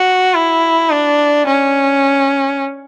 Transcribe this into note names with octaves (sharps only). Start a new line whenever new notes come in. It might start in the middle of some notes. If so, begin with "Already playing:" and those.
Already playing: F#4
E4
D4
C#4